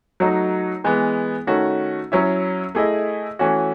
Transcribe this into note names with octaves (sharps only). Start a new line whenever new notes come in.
F#3 A3 D#4 F#4
E3 G#3 B3
D#3 A3 C#4 F#4
F#3 C#4 E4
A3 E4 G#4 D#5
E3 A3 C#4 F#4